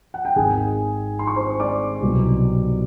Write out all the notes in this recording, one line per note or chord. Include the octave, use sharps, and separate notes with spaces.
F#5
G5
G#1 G#2 D#3 G#4 G#5
C6
C#6
C5 C6
D5 D6
C2 B2 F#3 B3